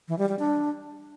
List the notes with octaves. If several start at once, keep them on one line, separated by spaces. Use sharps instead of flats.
E3
G3
G3
D4